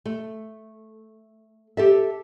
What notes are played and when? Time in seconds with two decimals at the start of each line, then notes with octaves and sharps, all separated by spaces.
0.06 A3
1.77 G4 A4 E5